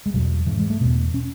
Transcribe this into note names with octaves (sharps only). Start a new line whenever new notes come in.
G#3
E2 B2 F#3
G#2 E3
G#3
A3
E2 B2 B3
C#4